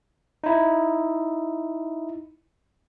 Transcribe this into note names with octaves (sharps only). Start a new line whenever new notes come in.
D#4 E4